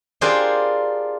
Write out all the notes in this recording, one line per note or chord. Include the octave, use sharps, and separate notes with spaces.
D4 F4 G4 G#4 A#4 C5